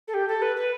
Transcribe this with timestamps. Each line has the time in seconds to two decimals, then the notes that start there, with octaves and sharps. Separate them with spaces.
0.07 A4
0.13 G4
0.28 A4
0.41 B4
0.56 B4